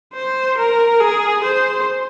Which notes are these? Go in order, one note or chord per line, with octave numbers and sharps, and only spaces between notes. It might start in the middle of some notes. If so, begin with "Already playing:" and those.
C5
A#4
G#4
C5